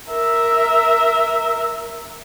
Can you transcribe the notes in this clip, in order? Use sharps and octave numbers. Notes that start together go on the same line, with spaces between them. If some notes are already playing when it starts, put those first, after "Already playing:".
A#4 E5